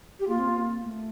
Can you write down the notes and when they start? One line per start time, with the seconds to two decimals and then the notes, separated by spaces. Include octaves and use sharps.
0.19 G4
0.27 A#3 F4
0.39 C4
0.51 A#3
0.83 A3